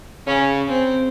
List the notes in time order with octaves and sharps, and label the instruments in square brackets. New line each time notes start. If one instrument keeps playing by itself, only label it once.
[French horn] C#3 [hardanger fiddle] C#4
[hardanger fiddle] C4